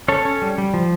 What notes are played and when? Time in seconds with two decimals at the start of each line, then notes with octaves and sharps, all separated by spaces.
0.08 C#4 A4 C#5
0.25 C#4
0.42 G3
0.58 G3
0.74 F3